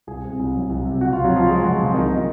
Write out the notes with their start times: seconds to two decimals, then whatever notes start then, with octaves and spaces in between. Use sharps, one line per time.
0.07 C2 G#4 G#5
0.24 C3
0.39 C2
0.54 F#3
0.69 C2
0.85 C3
1.01 C#2 F#4 F#5
1.12 F4 F5
1.17 C3
1.24 F#3 F#4
1.33 C#2 F3 F4
1.48 F3 G#3 G#4
1.63 C#2 F#3 F#4
1.79 C3 F3 F4
1.94 C2 D#3 D#4
2.11 A#2